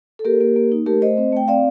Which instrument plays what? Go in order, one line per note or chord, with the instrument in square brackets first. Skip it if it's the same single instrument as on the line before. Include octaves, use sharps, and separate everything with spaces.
[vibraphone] A4
A#3 G4 A#4
A#3
A#3
D#4
A3 G4 A#4
A3 C5 D#5
C4
A3 G5
C4 D5 F5